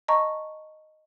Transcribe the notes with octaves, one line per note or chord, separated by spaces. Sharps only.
D#5 A5 A#5 C#6